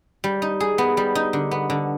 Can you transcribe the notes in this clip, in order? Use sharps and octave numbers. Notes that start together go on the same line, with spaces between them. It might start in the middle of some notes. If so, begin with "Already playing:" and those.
G3
D#4
G#4
B3
G3
D#4
D3
B3
D3